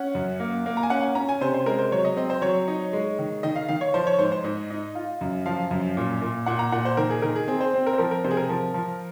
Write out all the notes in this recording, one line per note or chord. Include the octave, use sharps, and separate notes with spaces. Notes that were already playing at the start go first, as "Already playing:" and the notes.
Already playing: C#4 F#5
F#2
A#3
A#3
A#5
G#5
C#4 F#5
G#5
C#4 A#5
G#5
C3 C5
C5
G#3 A#4
C5
F#3 C#5
D#5
C4 D#5
C5
F#3 C#5
D#4
G#3
D#3
D#3 D#5
F5
D#3 F5
C#5
F3 C5
C#5
G#2 C5
C5
G#2 D#5
D#4
F4
F#2
F3 F5
F#2
A#2
A#2
A#2 F#5
A#5
A#2 F#5
C5
D#3 A#4
G#4
D#3 A#4
G#4
C4 G#4
C5
C4
A#4
C5
F3 A#4
A#4
C3 C5
G#4
A#4
F3
F3